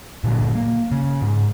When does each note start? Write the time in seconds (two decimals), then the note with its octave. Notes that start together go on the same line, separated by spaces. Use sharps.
0.24 A#2 D3 F#3
0.55 A#3
0.92 C#3
1.22 G#2